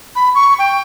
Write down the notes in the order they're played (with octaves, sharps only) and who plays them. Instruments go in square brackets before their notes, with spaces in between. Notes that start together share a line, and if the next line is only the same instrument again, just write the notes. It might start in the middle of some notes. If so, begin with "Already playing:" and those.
[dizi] B5
C#6
G5